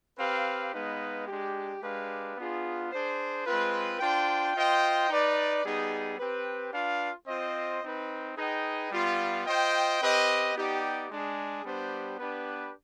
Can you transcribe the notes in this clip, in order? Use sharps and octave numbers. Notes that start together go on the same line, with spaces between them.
C4 G4 B4 F5
G#3 B3 D#4 B4 F5
G#3 D4 G4
G#3 D4 G4 B4 F5
B3 D4 F4 G#4
D4 G#4 C5
G#3 C4 F4 B4
D4 F4 C5 G5
F4 C5 D#5 G5
D#4 B4 D5
G3 B3 D#4 G#4
C4 G4 B4
D4 F4 B4 F5
C4 F4 C5 D#5
C4 D#4 B4
D#4 G#4 B4 D#5 G5
G3 B3 F4
F4 C5 D#5 G5
C4 G4 B4 D#5
B3 D#4 G4 D5
G#3 D4 G#4
G3 B3 D4 G4 C5
B3 D4 G4 B4